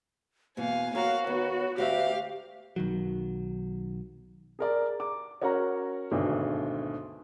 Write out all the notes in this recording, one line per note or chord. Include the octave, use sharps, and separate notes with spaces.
E2 B2 A#3 F5 G#5
F#4 A#4 C#5 F5
D#2 B3
D2 F#4 G4 E5 F5
B1 D#3 F#3
G#4 A#4 D5
D6
C#4 F#4 A#4 C#5 F#5 A#5
G#1 D2 B2